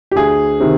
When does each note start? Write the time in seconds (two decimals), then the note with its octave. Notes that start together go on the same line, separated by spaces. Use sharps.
0.11 G4
0.15 D2 G#4
0.60 C3 D#3